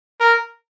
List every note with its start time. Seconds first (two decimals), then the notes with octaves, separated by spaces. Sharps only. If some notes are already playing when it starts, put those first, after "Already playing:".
0.20 A#4